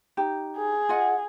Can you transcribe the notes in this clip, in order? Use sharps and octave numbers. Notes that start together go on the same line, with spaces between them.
D#4 G4
G#4
F4 D#5 F#5